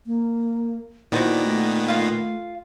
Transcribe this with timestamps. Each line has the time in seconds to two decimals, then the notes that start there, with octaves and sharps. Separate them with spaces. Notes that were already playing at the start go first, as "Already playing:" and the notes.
0.06 A#3
1.12 A#2 D#3 B3 E4 F#4 C5 D5
1.44 A3
1.88 A3 F4 F5